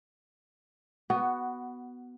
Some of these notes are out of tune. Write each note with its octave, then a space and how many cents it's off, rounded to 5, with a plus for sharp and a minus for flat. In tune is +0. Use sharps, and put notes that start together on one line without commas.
B3 +0 F#4 +15